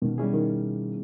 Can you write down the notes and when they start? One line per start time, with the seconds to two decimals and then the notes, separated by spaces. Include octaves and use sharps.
0.02 B2 D#3
0.18 G3 C#4 E4 G#4
0.34 D#3